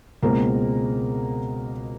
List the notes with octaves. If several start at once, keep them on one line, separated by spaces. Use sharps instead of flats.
C#2 B2 G#3 A#3 C4 A#4